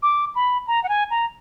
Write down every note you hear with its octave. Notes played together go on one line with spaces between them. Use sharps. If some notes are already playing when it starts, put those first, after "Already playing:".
D6
B5
A#5
F#5
G#5
A#5